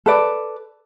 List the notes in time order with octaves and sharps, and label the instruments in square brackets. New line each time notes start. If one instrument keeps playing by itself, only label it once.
[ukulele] A4 B4 D5